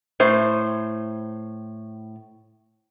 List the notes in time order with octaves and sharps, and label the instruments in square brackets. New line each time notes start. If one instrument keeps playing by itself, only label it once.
[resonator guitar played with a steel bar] A2 C5